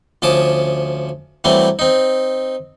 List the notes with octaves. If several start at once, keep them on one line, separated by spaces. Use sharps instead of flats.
D2 F3 C#4 A5 D6 D#6
E3 F#3 G3 A3 C4
C4 D#4